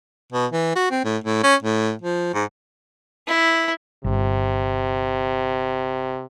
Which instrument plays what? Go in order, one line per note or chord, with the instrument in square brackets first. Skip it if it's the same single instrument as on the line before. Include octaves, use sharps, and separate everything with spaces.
[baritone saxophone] B2
E3
F#4
C4
A2
A2
C#4
A2
F3
G#2
[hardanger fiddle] E4
[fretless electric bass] G1 [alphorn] C3